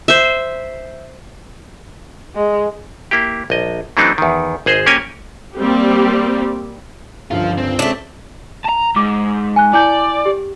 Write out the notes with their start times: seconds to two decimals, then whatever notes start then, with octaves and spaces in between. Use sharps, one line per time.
0.08 C5 E5
2.35 G#3
3.11 A#3 E4 G4
3.50 A#1 D#5
3.97 E3 F#3 A3 C4 D4 D#4
4.18 E2 D#3
4.66 G#1 G#4 C5 D#5
4.86 A#3 C#4 G4 A#4 G#5
5.56 G3 A#3 C4 G4
7.31 G1 C#2 G2 F3 F4
7.58 C4
7.79 G#3 A3 C#4 D4 D5
8.65 A5 A#5
8.96 G#2 D6
9.56 G#5 F#6
9.74 E4 D5 G#5 G6
10.26 G4